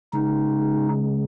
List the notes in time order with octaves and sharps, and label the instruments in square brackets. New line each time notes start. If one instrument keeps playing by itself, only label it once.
[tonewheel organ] C#3 G#3 [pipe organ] D#4